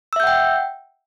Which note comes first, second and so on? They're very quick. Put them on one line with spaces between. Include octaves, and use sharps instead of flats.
E6 E5 G6 F#5 G5